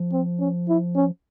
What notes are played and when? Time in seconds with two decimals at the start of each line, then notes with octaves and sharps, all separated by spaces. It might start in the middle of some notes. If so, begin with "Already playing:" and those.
Already playing: F3
0.13 C4
0.40 C#4
0.69 E4
0.96 C#4